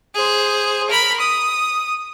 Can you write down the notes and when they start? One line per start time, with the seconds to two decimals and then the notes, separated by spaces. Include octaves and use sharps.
0.14 G#4 C5
0.90 A#4 B5
1.20 D#6